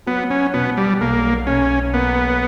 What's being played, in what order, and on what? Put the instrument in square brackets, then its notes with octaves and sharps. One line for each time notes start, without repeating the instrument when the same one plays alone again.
[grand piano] F#3 [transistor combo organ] B3
[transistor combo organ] C#4
[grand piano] B2 [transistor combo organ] B3
[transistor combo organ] G3
[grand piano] B1 [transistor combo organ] A#3
[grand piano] B1 [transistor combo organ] C#4
[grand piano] A#3 [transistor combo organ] B3